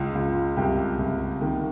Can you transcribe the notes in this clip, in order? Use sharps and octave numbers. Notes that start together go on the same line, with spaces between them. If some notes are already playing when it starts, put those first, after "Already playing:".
Already playing: C#2 F4
C#2 F4
C2 G4
C2
D#3